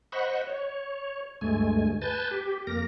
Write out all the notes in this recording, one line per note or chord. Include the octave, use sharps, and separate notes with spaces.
C5 D#5 F#5 B5 C#6
C#5
D2 G2 G#3 A3 G#5
B4 G#5 A5 G6 A6
G4
F2 A#3 A#4 A#6